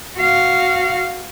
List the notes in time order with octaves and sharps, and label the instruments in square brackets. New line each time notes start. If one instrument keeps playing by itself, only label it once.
[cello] F#4 F5